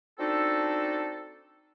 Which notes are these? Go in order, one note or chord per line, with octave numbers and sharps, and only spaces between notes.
C4 D4 D#4 F#4 A4